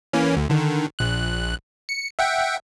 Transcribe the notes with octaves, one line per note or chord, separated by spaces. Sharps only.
E3 A#3 C#4
D2
D3 D#3
A#1 F#6
C#7
E5 F#5 G5